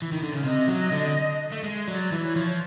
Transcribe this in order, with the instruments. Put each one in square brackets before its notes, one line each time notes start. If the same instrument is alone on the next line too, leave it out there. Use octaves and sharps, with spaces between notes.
[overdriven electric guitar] E3
D#3
D3
C#3
[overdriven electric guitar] C3 [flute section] D#5
[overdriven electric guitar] F#3
D3
A3
G#3
[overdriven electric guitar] F#3 [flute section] D5
[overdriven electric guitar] E3
[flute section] C#5
[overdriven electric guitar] F3